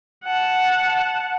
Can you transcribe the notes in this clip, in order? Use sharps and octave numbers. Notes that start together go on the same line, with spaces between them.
F#5 A5